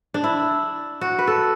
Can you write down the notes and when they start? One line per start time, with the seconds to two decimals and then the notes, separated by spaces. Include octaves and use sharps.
0.14 D4
0.24 E4
1.01 F#4
1.19 B4
1.27 A4